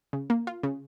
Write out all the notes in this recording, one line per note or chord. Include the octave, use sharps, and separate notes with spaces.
C#3
A#3
F4
C#3